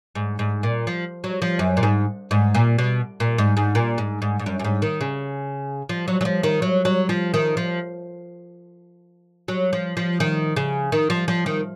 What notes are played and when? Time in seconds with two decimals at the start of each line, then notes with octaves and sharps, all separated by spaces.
0.15 G#2
0.39 G#2
0.63 A#2
0.87 F3
1.24 F#3
1.42 F3
1.59 F#2
1.77 A#2
1.83 G#2
2.31 G#2
2.55 A#2
2.78 B2
3.20 A#2
3.38 G#2
3.57 G#2
3.75 A#2
3.98 G#2
4.22 G#2
4.39 G#2
4.46 F#2
4.59 F#2
4.64 G#2
4.82 D#3
5.01 C#3
5.89 F3
6.08 F#3
6.21 F#3
6.25 F3
6.43 D#3
6.62 F#3
6.85 F#3
7.09 F3
7.34 D#3
7.57 F3
9.48 F#3
9.73 F3
9.97 F3
10.20 D#3
10.56 C#3
10.92 D#3
11.10 F3
11.28 F3
11.46 D#3